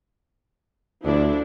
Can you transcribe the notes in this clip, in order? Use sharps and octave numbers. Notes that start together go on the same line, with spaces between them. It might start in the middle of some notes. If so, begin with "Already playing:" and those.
D2 F3 D4 E4